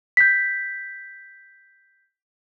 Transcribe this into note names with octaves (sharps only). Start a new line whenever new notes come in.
G6 B6